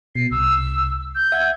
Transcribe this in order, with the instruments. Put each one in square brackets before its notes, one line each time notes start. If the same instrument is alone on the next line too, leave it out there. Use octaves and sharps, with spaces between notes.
[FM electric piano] B2 [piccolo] C7
[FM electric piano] C2 [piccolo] E6
[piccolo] G6
[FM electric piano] E5 F#5 G#6